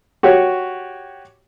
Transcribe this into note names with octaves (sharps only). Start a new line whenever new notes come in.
F#4 G4 C#5